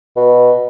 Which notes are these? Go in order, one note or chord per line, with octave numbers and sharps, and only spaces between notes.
B2